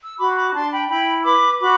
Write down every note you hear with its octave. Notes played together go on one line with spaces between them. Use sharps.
E6
F#4 B5 D6
C6
B5 D6
D4 A5 C6
G5 B5
E4 G5 B5
B4 B5 D6
F#4 B5 D6